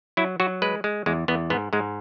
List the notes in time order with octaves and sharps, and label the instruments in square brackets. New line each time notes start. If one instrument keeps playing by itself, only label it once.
[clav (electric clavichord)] F#3 E4
F#3 F#4
G#3 B4
G#3
E2 G#3
E2 B3
G#2 B3
G#2 G#3